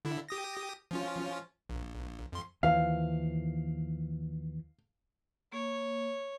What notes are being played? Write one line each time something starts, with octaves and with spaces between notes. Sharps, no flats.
D3 E4
G4 D#6 A#6
F3 C#4 F4
A#1
F2 C6
D#2 E3 F3 F5
A#3 C#5